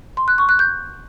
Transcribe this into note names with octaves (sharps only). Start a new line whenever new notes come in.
C6
F#6
C#6
F#6
G6